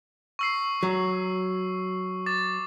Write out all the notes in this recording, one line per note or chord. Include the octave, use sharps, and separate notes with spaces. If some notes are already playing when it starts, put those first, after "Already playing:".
C#6 E6 C7
F#3
D6 A6